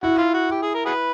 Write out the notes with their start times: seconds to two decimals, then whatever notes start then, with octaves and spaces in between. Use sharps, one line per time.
0.03 E4 F#4
0.18 F4
0.34 F#4
0.51 G4
0.62 G#4
0.74 A#4
0.86 F#4 G#4 B4